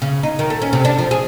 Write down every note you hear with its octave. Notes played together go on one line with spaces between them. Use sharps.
C#3
D#4
D#3
A3
C#4
C3
D4
F3
G#4